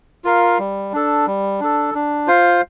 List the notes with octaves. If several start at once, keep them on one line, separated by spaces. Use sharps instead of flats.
F4 A#4 F5
G3
D4 A4
G3
D4 A4
D4
F4 C5 F5